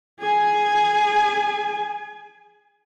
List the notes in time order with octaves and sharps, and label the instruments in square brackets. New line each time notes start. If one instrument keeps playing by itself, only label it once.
[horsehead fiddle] G#4 G#5